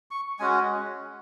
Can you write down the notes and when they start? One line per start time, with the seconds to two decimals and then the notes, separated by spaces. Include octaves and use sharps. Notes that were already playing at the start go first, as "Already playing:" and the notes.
0.11 C#6
0.40 G#3 C#4 F#4 G#5